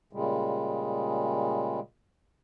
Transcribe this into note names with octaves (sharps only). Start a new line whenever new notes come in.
A#2 C#3 G3 G#3